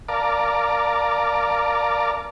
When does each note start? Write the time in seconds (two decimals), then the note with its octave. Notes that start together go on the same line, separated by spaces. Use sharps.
0.09 A#4 D5 F5 A5